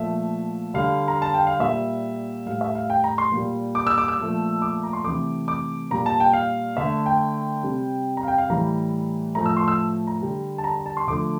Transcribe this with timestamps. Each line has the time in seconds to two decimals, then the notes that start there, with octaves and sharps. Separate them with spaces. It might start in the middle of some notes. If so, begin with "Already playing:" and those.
Already playing: A#2 F3 A3 E5
0.74 D3 G3 F5
1.08 A#5
1.22 A5
1.34 G5
1.47 F5
1.60 A#2 G3 E5
2.46 A2 G3 F5
2.61 E5
2.75 F5
2.90 G5
3.04 A#5
3.18 C6
3.32 A#2 G3
3.75 D6
3.87 E6
3.98 D6
4.08 E6
4.19 A#2 F3 A3
4.62 D6
4.83 A#5
4.93 C6
5.04 C3 E3 A3 D6
5.48 D6
5.91 A#2 G3 A#5
6.06 A5
6.20 G5
6.33 F5
6.77 D3 A3 E5
7.06 G5
7.63 C3 G3
8.17 A#5
8.23 F5
8.28 G5
8.38 F5
8.49 A2 E3 G3 A#5
9.35 A2 F3 A3 A#5
9.46 E6
9.57 C6
9.68 E6
10.07 A#5
10.22 D3 G3
10.58 A5
10.64 A#5
10.75 A#5
10.86 A5
10.97 C6
11.08 D3 F3 A3 D6